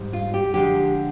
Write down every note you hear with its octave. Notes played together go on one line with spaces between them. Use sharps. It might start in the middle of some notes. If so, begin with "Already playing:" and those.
Already playing: G#2 G3
F4
G4
D3 F3 G#3 G4